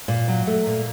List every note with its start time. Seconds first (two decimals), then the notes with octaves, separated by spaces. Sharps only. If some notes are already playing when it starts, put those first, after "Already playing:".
0.08 A#2
0.28 F#3
0.47 A3
0.66 A#2